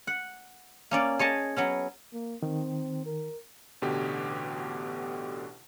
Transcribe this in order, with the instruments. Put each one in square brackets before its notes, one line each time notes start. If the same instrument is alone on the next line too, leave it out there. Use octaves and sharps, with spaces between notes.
[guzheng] F#5
A#3 C#4 D5
G#4 C#5 D#5 A5
F#3 B3 C#4
[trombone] A#3
[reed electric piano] D#3 [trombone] C4
[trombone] A#4
[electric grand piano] A1 B2 D3 G4